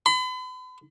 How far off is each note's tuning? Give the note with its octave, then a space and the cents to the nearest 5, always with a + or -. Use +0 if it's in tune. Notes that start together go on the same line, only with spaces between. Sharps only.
B5 +40